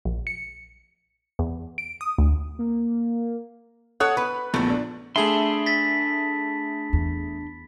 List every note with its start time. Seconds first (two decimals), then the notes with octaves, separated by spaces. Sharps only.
0.05 A#1
0.27 C#7
1.39 E2
1.78 D7
2.01 D#6
2.18 D2
2.59 A#3
4.00 A4 C#5 F#5 D#6 F#6
4.17 B4 B5
4.54 A#1 E2 D3 A3
4.70 D4
5.16 A3 D4 G#4 E5 B5 C6 F#7
5.66 A6 B6
6.93 E2